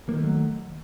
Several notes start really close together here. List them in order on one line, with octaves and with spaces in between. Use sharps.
A#3 D#3 A3 F#3